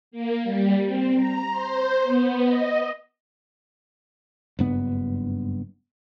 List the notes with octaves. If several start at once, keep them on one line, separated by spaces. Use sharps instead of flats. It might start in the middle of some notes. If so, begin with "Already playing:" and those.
A#3
G3
C4
A#5
C5
B3
D#5
F#1 G2 B3